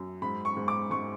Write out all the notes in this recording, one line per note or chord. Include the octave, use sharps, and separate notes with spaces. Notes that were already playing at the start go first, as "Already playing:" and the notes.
Already playing: F#2
G#2 B5
C#6
G#2
D6
G#2 C#6